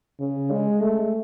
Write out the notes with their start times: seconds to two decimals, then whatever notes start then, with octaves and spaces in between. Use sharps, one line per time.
0.20 C#3
0.51 G#3
0.81 A3